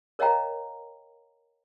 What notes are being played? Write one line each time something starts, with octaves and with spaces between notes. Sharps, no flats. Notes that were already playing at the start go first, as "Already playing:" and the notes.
A#4 C#5 D#5 F5 G5 A#5